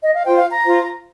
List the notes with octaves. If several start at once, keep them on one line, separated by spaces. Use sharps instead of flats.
D#5
F5
F4 C5 G5
F5
A#5
F4 C5